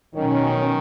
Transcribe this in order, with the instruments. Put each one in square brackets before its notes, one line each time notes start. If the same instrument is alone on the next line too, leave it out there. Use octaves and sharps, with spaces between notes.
[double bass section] B2 F#3 C#4 [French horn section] D#3